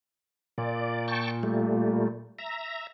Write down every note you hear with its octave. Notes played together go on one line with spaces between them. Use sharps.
A#2 D5
G5 A5 C#6
G3 A3
E5 A#5